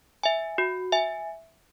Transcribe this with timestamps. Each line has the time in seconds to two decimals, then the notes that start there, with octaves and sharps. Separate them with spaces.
0.23 E5 G#5
0.58 F#4
0.92 E5 G#5